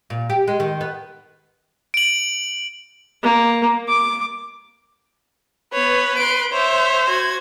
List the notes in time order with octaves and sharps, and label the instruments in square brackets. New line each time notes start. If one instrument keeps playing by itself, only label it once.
[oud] A#2
G4
G#3
D#3
B3
[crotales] D7 F#7
[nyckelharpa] A#3
D6
[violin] B3 C#5 [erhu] B4
[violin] C6 D7
[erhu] C5 [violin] C#5 E5
[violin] F#4 G#6